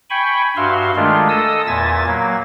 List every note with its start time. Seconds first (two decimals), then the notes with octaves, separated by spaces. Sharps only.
0.10 G5 G#5 B5 C#6
0.56 G2 F#4 E5 F5 C6
0.96 D#3 G#3 A3 D4 F4
1.29 A4 D#5 D#6 E6
1.67 E2 A#2 E5 G#5 A6
2.07 F#3 A#3